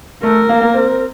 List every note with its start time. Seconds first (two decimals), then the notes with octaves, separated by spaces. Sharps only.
0.23 A3 A#4
0.49 A#3
0.61 A#3
0.74 C4